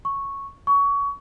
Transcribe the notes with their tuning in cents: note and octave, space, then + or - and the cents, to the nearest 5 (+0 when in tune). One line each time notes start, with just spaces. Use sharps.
C#6 -5
C#6 +25